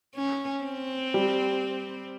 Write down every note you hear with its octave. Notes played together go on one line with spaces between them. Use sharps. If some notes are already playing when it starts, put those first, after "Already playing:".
C#4
C4
G3